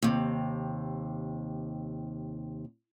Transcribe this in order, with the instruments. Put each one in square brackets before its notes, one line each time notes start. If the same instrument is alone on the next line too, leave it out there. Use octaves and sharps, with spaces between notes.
[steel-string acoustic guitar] D#2 C3